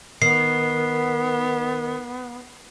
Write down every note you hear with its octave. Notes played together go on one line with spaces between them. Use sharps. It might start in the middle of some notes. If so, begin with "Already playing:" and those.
D#3 B3 C7